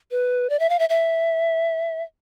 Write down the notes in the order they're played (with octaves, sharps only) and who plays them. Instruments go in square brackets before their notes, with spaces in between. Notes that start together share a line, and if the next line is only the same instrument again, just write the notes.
[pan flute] B4
D5
E5
F5
E5
E5